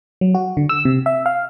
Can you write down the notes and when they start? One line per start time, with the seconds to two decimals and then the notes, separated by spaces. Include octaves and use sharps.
0.21 F#3
0.35 F#4
0.57 D3
0.69 E6
0.85 C3
1.06 E5
1.26 F5